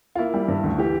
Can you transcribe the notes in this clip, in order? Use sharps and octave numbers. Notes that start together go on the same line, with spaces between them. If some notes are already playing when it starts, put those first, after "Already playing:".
F4
A#3 E4
G3
G2
D2
E3 G4